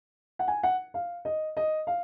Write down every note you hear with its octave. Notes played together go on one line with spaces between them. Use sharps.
F#5
G#5
F#5
F5
D#5
D#5
F5